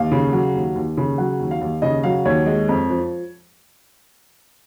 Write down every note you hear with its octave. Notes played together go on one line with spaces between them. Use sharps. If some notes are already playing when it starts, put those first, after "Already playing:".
Already playing: D#2 F5
C#3
F#3
D#2
D#2
C#3
F#3 F#5
D#2
F5
D#2
C#3 D#5
F#3 F5
D#2 C#5
G#3
F2
F3